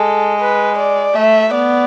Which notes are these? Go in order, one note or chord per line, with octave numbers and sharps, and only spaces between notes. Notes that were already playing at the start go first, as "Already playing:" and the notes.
Already playing: G#3 A4
B4
D5
A3 E5
B3 D5